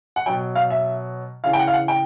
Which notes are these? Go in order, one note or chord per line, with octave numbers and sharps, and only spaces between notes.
F#5
B2 F#3 G5
F5
E5
C#3 E3 F5
G5
F#5
F5
F#5
G5